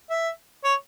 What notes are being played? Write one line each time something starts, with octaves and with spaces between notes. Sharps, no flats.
E5
C#5